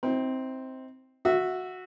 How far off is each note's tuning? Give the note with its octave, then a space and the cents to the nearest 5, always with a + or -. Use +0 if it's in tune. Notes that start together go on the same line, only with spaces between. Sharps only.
C4 +0 D#4 +45
F#4 -10 E5 +0